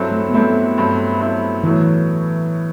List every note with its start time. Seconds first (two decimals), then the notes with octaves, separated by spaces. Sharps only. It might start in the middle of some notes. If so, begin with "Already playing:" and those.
Already playing: G2 F#3 C4 E4 A4
0.12 A3
0.28 B3
0.34 G2 F#3 A3 C4 E4 A4
0.78 G2 F#3 C4 E4 A4
1.20 G2 F#3 C4 E4 A4
1.64 A2 E3 F#3 A3